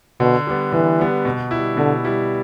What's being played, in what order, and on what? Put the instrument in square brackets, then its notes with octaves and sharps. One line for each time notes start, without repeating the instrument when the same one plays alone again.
[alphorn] B2 [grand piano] D3
[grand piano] G3 B3
[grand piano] D3 [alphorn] E3
[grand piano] G3 B3
B2
G3 E4
[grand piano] B2 [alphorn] D3
[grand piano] G3 E4